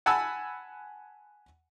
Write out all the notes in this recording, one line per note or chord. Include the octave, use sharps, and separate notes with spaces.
F#5 G#5 A5 B5 E6